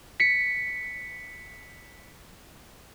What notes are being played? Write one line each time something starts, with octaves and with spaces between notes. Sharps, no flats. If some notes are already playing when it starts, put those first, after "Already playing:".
B6 C#7